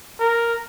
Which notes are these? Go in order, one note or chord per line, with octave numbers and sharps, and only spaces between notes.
A#4